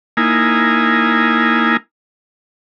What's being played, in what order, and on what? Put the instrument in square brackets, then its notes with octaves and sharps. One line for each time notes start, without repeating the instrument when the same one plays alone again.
[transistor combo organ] A#3 D#4 E4 G#5